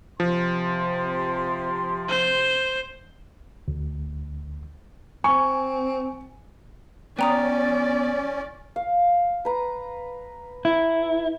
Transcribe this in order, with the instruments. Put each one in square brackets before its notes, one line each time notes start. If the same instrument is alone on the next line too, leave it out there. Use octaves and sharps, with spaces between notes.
[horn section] C3 C6 [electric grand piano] F3
[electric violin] C5
[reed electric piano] D2
[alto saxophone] C4 [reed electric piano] G#5 [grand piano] C#6
[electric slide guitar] B3 [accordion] C#4 [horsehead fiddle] D5 [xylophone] G5 A#5 D#6
[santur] F5
B4 A#5
[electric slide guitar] E4